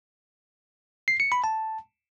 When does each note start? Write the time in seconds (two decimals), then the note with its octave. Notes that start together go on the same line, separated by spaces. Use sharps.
1.08 C7
1.20 C#7
1.32 B5
1.44 A5